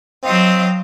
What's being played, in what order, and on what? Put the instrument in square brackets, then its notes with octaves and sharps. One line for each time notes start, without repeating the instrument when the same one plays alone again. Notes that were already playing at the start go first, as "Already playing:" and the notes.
[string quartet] F#3 D#5 F5 [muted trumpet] C4